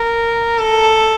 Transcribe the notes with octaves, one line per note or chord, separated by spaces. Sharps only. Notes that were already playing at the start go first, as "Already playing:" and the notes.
Already playing: A#4
A4